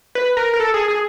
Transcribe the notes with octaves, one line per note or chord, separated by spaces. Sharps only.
B4
A#4
A#4
A4
G#4
G#4